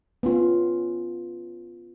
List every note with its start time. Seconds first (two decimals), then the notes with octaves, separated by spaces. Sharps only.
0.23 B3 C#4 F4